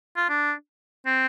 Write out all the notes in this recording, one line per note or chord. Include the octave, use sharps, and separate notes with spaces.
F4
D4
C4